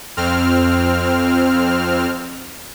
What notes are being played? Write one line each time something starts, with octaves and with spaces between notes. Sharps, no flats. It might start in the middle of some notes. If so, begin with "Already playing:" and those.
F2 C4 F6